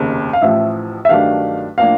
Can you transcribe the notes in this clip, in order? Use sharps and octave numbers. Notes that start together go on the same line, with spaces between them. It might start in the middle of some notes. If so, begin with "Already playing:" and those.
Already playing: F1 D#2 C#3
F5
A1 A2 F3 E5
E5
G2 D#3 F#3 A3 D4 F5
A2 F3 A#3 D4 F5